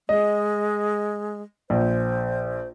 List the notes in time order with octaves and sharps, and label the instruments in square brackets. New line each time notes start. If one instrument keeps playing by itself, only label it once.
[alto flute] G#3 [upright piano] D#5
[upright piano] A#1 [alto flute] C5